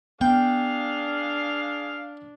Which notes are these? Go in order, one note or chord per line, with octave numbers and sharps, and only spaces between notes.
B3 D4 G#4 F5 G5